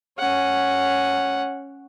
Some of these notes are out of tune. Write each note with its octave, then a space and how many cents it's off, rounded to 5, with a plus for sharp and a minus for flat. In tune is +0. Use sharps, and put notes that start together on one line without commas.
C#4 +0 F#5 +0